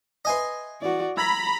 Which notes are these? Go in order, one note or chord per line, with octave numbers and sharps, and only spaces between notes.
B4 D#5 E5 G#5 C6
E3 F#4 D5
A#5 B5 E6 G#6 B6